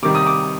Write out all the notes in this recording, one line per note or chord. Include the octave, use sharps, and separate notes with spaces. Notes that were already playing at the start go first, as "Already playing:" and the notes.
C3 D#3 G3 D6
D#6
D6